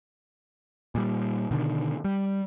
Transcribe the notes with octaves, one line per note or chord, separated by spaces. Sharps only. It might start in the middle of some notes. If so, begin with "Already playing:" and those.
A#2 G3
B2 D3 D#3
G3